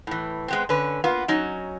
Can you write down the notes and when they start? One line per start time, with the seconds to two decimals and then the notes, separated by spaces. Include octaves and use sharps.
0.07 A2 E3
0.48 G#3 B3 C4
0.69 D3 C#4 B4
1.04 A#3 B3 F4
1.28 F#3 C#4 D#4